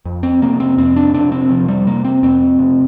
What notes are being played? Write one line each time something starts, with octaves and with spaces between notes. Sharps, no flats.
F2
C4
C3 A#3
C4
F2 C4
D4
C3 D4
C4
C3 F3
G3
C3 A#3
C4
F2 C4
C3